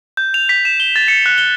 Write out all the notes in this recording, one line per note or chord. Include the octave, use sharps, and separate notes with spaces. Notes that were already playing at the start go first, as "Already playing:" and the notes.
G6
F7
B6
E7
G7
A6
C#7
F#6
G7